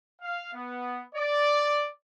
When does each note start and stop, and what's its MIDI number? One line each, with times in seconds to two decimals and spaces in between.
0.22 0.53 77
0.54 1.02 59
1.15 1.89 74